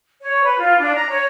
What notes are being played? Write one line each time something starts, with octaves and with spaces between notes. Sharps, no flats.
C#5
B4
F4
D4
A#5
C#5